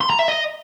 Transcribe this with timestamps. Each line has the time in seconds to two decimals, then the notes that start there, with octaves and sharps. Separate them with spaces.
0.01 C6
0.10 A#5
0.19 E5
0.28 D#5